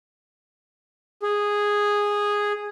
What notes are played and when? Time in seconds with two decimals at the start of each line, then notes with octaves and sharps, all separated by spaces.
1.22 G#4